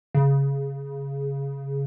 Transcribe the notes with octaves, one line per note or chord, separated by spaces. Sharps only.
C#3